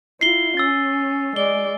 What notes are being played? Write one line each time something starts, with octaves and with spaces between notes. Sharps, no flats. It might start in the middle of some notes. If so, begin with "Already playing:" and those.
E4 F4 C7 G7
C#4 E6 A6
G#3 D5 G7